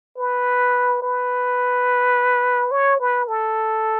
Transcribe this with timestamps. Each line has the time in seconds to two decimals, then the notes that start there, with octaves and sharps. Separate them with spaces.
0.18 B4
1.02 B4
2.71 C#5
3.00 B4
3.28 A4